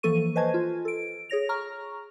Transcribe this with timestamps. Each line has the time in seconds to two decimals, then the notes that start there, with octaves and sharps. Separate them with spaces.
0.03 E3 F3 A#3 A4 C#6 D#7
0.36 B4 C5 D#5 G#5 A5 G#6
0.54 F4
0.85 A4 D7
1.30 G#4 C#5 A#6 F7
1.49 A#5 C#6 F6